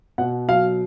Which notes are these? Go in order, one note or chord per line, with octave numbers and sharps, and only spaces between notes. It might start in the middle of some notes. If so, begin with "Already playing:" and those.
B2 F#5
F#3 F5